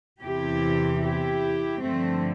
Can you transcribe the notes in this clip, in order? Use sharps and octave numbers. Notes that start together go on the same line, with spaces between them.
E2 C3 E3 E4 G4
E4 G4
G2 D3 F3 A3 C4